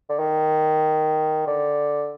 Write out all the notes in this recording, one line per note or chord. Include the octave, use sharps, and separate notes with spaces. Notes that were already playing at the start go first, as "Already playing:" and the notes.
D3
D#3
D3